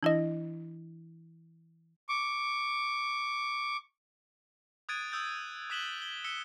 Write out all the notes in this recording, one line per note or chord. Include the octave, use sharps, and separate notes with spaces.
E3 D4 E4 D#5
C#6 D6
D#6 F#6 G#6 A6 D7 D#7
D#6 E6 G6 A6
D#6 F#6 B6 E7 F#7 G7
F#7 G7
E6 B6 C#7 E7 G7